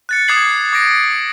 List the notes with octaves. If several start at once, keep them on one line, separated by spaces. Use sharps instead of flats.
F#6 A6 C#7
D6 D#6 F#6 G#6 C7 F#7
D6 G#6 A#6 D7